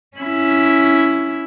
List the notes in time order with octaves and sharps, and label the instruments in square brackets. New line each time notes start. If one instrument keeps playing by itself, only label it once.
[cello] C#4 E4